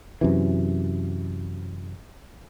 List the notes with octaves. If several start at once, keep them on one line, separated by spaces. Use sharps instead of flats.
F#2 C3 E3